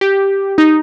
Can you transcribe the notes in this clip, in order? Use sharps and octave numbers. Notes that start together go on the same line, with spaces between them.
G4
D#4